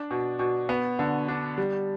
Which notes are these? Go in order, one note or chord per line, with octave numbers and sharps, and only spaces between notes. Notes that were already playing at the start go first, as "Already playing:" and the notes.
Already playing: D4
B2
B2
B3
D3
D4
G3